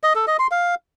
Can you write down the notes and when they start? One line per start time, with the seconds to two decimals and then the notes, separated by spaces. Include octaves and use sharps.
0.03 D#5
0.15 A4
0.27 D#5
0.39 C6
0.51 F5